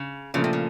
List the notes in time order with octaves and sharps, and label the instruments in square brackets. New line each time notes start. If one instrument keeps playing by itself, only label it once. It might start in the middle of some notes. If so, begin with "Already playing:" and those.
Already playing: [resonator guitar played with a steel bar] C#3
[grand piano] A#2 F3 A3 [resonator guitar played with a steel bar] C#3
[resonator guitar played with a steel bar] C3
C#3